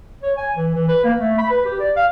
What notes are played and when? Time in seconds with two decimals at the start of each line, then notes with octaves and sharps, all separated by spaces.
0.23 C#5
0.37 G#5
0.55 E3
0.74 E3
0.88 B4
1.04 A#3
1.20 A3
1.38 B5
1.50 B4
1.65 G4
1.80 D5
1.96 F5